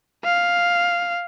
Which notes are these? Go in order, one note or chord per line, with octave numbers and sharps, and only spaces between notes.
F5